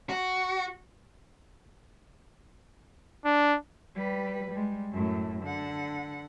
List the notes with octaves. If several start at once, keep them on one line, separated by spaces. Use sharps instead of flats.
F#4
D4
G3 B4
G3 G#3
F#2 A2
D3 F#5